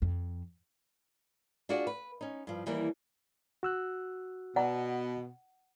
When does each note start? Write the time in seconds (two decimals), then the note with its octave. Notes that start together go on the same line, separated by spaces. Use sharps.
0.02 F2
1.69 D4 F4 F#4 G#4 D5
1.87 B4
2.21 C#4 D#4
2.47 G2 F3
2.66 D#2 E3 G3 A#3
3.63 F#4 E6 F#6
4.56 B2 D5 F#5 A#5